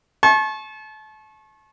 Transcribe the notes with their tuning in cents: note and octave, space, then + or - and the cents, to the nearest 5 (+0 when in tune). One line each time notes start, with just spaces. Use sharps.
A5 -35 C#6 -35